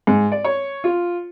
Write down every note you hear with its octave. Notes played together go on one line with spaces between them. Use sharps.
G#2
D5
C#5
F4